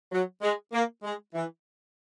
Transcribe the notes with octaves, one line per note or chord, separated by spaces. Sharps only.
F#3
G#3
A#3
G#3
E3